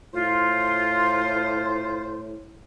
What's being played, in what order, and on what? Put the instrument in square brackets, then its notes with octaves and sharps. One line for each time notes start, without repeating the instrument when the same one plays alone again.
[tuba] A2 [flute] F4 [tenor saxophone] C5